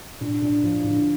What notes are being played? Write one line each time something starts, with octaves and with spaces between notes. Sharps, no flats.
A#2 D4
A#2 D4
A2 F3
A2 D3